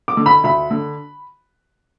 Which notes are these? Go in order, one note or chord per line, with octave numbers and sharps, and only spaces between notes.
D6
D3
B5
D2 B5
D3